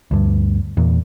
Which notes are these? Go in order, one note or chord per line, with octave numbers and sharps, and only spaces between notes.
D2 G2
E2 A#2